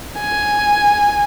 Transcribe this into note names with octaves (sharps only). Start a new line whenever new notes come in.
G#5